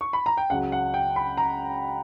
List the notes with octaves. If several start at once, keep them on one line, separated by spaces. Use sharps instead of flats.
C#6
B5
A#5
G5
C#2 C#3 F#3 F#5
F#5
G5
B5
A#5